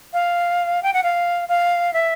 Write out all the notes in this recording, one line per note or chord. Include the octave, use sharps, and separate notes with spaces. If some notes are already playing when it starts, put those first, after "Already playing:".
F5
G5
F#5
F5
F5
E5